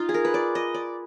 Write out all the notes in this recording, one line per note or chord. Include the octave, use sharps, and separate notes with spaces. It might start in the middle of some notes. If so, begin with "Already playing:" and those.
Already playing: D#4 F4
G#4
A#4
B4
D5
D#5
D5